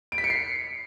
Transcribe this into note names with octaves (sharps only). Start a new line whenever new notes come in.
D7
B6
C#7
C7